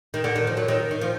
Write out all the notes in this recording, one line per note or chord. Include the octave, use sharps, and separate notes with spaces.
D#3
D3
D#3
F3
F#3
D#3
D#3
F3